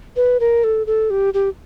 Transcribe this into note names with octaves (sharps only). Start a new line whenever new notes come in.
B4
A#4
A4
A4
G4
G4